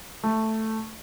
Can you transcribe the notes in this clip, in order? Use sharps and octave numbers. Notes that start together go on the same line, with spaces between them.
A3